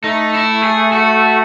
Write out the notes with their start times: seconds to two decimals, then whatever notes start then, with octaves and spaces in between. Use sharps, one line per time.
0.04 A3 D#4
0.34 E4
0.63 G#4
0.93 F#4